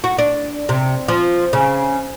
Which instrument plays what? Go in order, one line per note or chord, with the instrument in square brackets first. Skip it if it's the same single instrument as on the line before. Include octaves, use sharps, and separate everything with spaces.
[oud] F#4
D4
C3
F3
C#3